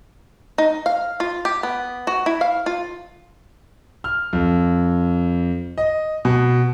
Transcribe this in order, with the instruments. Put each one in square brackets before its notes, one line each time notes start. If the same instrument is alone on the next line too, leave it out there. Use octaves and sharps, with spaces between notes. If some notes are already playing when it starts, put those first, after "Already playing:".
[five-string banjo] D#4
F5
F4
G4
B3
F#4
E4
F5
F4
[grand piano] F6
F2
D#5
B2